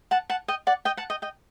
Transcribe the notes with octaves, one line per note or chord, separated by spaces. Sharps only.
F#5 A5
F#5 A5
D#5 G5
D5 F#5
D#5 G5
F#5 A5
D#5 G5
D#5 G5